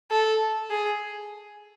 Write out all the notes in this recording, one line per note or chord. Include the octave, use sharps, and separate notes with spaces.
A4
G#4